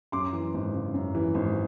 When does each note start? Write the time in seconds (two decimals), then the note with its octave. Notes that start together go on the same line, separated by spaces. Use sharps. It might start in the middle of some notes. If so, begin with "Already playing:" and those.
0.12 F#2 C6 D6
0.33 E3
0.54 G#1
0.74 C#3
0.94 F#2
1.15 E3
1.35 G#1